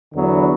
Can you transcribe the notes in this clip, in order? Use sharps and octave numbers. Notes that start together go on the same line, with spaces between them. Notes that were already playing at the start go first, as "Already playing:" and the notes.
E2 D3 F#3 B3 E4